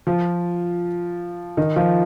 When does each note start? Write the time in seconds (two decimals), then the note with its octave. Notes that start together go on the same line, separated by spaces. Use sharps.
0.07 F3 F4
1.57 D#3 D#4
1.76 F3 F4